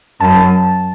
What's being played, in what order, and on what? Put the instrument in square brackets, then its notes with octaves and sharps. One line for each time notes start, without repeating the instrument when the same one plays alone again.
[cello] F#2 [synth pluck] A5